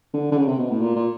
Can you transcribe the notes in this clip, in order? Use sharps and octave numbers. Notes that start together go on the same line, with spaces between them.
D3
D3
C#3
C3
B2
A2
A#2
A#2